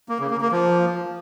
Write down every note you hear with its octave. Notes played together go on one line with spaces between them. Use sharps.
A#3
C#3
A#3
A#3
F3